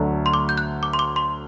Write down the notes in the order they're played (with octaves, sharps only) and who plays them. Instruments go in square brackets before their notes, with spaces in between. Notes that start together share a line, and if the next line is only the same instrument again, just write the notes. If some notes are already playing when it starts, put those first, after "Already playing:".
Already playing: [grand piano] D2 D3 F#3 A3
[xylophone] C6
D6
G6
F#6
D6
C6
D6
C6